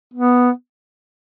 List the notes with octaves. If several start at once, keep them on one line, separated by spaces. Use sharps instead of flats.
B3